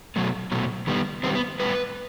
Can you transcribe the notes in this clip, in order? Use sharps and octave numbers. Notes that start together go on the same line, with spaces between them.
B2 F#3 A3
B2 F#3 A3
D#3 G3 B3
D#3 G3 B3 C4
B3
A2 G3 B3 B4